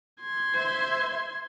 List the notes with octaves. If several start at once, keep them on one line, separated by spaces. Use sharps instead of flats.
C6 G#6
C5 E5